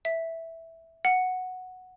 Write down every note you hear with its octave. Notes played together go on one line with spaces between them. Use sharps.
E5
F#5